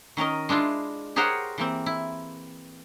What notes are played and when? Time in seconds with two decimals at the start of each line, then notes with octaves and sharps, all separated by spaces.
0.17 D#3 C#4 A#4 D#5
0.49 G#3 D4 E4 F4
1.16 G4 G#4 A#4 C5 C#5 F#5
1.58 E3 A#3 C4
1.86 E4